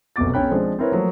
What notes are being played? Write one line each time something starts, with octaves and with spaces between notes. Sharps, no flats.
F1 F#2 B2 D6 A6
B1 C#4 C#5 G5 B5 F#6
F3 G#3 C4 D4
C4 E4 A#4 B4 C#5
F3 F#3 A3 A#3